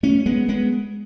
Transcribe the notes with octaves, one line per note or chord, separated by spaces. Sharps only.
A3 C#4
G#3 B3
G#3 B3